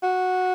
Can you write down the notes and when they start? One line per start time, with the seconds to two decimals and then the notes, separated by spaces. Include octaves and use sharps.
0.03 F#4